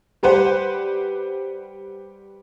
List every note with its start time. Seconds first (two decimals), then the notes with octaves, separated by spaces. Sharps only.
0.23 G3 G4 B4 C5 F#5